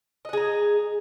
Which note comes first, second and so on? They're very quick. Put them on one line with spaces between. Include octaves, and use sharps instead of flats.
D#5 F#5 G#4 A#5